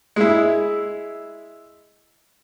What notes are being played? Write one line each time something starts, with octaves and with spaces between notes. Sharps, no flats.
G#3 E4